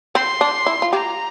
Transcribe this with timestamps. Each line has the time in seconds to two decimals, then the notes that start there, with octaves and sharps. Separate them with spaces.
0.15 C4 C6
0.41 D4
0.66 E4
0.82 F4
0.93 G4 A#5